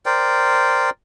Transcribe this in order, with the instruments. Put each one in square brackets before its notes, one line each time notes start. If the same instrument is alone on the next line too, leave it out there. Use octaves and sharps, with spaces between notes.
[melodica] A#4 C5 D5 G5